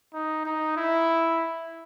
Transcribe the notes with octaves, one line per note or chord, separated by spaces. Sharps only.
D#4
D#4
E4